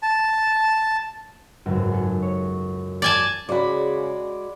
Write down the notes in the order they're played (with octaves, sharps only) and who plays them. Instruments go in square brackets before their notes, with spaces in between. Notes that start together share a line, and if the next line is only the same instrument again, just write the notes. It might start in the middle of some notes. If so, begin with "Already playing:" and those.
[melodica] A5
[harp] G#1 C#2 F#2
G#4 A4
C#5
[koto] D5 G#5 A5
[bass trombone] C#3 [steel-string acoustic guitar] G#3 F#4 [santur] D5 B5